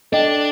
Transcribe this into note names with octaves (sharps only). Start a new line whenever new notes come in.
D4 A4 D#5 G5